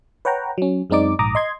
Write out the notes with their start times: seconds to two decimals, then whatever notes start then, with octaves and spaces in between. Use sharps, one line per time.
0.25 B4 C#5 F#5 G5 A#5
0.58 F#3 C#4
0.90 F#2 G#3 C4 D#4 D5 D6
1.19 A#1 G#2 A#5 D6 D#6
1.35 D#5 C6 G#6